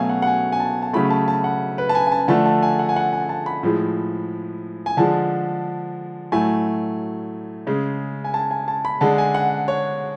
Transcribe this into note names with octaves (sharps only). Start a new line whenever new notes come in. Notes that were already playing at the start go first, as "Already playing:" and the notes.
Already playing: B2 F#3 A3 F5 G#5
F#5
F#5
G#5
G#5
A5
A5
C#3 F#3 A3 B5
A5
A5
F#5
B4
A5
G#5
G#5
A5
D3 F3 A3 A5
A5
G#5
F#5
G#5
F#5
G#5
A5
B5
A2 F3 G#3
G#5
D3 F3 G#3 A5
A2 F#3 A3 G#5
C#3 G#3
G#5
A5
G#5
A5
B5
D3 G#3 A5
A5
G#5
F#5
C#5